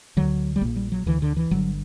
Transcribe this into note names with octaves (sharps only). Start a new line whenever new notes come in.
D2 D3 F#3
G3
A#1 A#2 A#3
G3
F#3
D2 D3 E3
D3
E3
G1 G2 D3 F#3